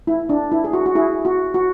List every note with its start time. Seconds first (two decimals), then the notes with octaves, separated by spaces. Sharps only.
0.07 E4
0.29 D4
0.51 E4
0.64 G#4
0.73 F#4
0.86 F#4
0.95 E4 G#4
1.25 F#4
1.54 F#4